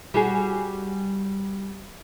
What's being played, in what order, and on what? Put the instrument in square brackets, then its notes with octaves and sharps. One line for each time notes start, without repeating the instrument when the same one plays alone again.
[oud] G3 F#4 G#4